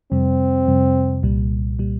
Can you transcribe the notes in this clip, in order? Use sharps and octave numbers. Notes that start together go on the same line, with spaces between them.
F2 C3 G3 C4
F2 C3 G3
C2 A#2 G3
A#2 G3